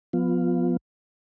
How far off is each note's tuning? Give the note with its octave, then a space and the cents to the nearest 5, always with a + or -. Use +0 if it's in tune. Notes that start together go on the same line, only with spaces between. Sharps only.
F3 +30 B3 +10 F4 +0